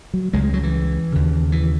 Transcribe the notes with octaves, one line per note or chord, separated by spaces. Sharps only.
F#3
C#2 C#3 G#3
G#3
F#3
E3
D#2 C#3
E3